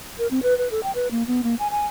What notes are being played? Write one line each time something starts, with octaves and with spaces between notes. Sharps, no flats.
A#4
C4
B4
B4
A4
G5
B4
A#3
B3
A#3
G#5
G#5